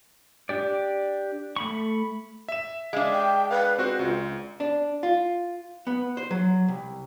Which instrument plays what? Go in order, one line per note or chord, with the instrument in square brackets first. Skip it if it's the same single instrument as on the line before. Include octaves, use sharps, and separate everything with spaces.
[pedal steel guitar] D4 G4 D5
A3 B5 C#6
[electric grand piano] E5 E7
[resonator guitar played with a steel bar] G#3 D4 [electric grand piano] E5 F5
[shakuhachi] G5
[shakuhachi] B4 [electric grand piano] F5
[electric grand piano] C4 F#4 C5
[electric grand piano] C#2 [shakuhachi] F4
[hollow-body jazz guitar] D4
F4
B3
C5
F#3
C2